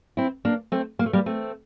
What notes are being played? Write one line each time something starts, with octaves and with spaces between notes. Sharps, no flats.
C4 E4
A#3 D4
A3 C4
A#3
A3
G3 A#3
A3 C4